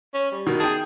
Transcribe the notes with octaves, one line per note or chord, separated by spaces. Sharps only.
C#4
G3
B2 D#3
G#4 G5 A5